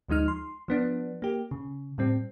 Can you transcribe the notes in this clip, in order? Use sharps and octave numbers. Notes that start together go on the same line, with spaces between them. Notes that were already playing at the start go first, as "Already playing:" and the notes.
D2 F3 G#3 D#4 F6
C6
F3 B3 D4
A#3 G4
C#3
A2 G3 C4